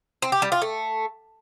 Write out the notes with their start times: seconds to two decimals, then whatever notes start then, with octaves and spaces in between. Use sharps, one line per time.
0.22 C4
0.32 G4
0.42 G3
0.52 F4
0.62 A3